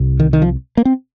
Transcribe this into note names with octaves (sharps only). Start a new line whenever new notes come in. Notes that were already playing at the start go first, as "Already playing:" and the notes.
Already playing: C2 C3
D#3
D#3
F3
A#3
C4